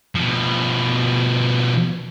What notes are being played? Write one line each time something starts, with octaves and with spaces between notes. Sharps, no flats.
B2 F3